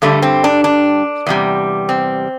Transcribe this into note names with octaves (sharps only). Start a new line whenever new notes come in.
G2 D3 G3 A3
C4
D4
D4
E2 C3 G3
C4